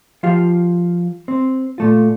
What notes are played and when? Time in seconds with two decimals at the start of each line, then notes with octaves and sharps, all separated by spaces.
0.23 F3 F4 G4 F5
1.28 C4
1.78 A#2 A3 F4